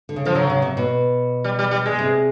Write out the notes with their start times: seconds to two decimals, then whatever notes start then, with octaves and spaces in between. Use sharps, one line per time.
0.09 D3
0.16 C#3
0.25 D3 F3
0.35 C#3 F#3
0.50 C#3
0.62 C3
0.77 B2
1.44 G3
1.59 G3
1.71 G3
1.86 G#3
1.99 C3